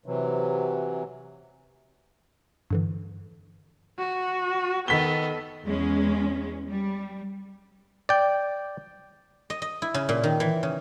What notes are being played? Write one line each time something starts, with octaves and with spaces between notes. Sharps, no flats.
C3 E3 F#3
G2 D3 E3
F#4
D#3 B3 A4 D#5 E6 B6 G7
E2 G#3 C#4
G3
D5 G5
D#5
D#5
E4
C#3
A#2
D#3
E3
C#3